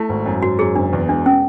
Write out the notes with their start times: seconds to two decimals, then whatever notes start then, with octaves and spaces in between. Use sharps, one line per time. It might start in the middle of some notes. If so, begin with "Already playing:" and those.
Already playing: A3 E4
0.09 G#1
0.26 F#2
0.43 G#1 F#4
0.59 F#2 G#4
0.75 F#1 D4
0.93 E2
1.09 E1 D4
1.26 C#4